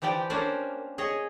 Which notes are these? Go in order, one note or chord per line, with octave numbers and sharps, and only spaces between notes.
E3 F3 G4 D5 G5
F3 A#3 C#4 D4 C5 D5
G#4 C#5 D#5